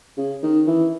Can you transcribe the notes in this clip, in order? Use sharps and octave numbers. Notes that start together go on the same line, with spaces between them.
C#3
D#3
E3